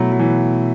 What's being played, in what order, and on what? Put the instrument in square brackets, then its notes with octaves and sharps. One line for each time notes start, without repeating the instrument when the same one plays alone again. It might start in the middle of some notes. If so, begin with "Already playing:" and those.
Already playing: [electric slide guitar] B2 A3 E4 [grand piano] F#3
[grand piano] F#3
E3